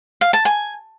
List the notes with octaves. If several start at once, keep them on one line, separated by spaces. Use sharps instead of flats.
F5
A5
G#5